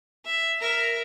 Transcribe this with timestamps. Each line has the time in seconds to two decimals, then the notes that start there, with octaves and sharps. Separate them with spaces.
0.25 E5
0.61 A#4 E5